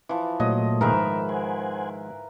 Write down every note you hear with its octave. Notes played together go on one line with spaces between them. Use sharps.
E3 F3
A#2 F#3 A3 A#3 D#5
G#2 D#3 F3 A#4 B4 E5
C5 F#5 G#5